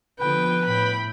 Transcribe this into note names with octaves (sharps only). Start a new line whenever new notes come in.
D3 F3 B3 B4 G5
A2 G5 B5